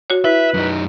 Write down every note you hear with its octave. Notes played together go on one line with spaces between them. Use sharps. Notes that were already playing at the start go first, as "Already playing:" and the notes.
F#4 C#5
E4 B4 E5
F#2 D#4